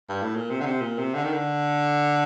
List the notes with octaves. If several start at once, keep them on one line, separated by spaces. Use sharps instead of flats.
G2
A2
A#2
C3
D3
C3
A#2
C3
D3
D#3
D3